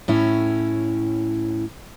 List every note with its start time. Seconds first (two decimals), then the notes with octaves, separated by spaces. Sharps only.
0.08 A2 C#4 E4